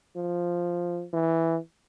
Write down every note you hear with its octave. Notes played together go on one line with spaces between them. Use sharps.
F3
E3